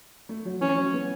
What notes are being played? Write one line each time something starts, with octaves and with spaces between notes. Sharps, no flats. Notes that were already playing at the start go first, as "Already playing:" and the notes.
A3
F#3
E3 C#4
F#3
B3